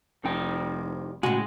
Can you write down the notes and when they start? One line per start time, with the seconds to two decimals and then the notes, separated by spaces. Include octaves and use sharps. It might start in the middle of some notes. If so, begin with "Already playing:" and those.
0.24 F1 C2 D#4 G5
1.23 A2 C#3 G#3 F#4 G#5